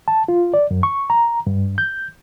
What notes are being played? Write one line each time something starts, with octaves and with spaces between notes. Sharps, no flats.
A5
F4
D5
F#2
C#6
A#5
G2
G6